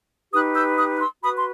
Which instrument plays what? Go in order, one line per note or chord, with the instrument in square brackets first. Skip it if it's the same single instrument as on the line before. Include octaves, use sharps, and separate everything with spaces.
[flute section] D#4 G4 B4 D#6 F#6
E6 G6
D#6 F#6
F#6
C6 E6
F#4 B5 D#6
B4
C6